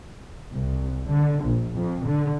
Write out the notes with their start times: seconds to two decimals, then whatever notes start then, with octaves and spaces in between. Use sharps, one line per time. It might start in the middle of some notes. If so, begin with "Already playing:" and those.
0.54 C2
1.11 D3
1.44 A#1
1.74 F2
2.06 D3